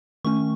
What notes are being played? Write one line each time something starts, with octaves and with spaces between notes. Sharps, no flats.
D#3 A3 C#4 C#6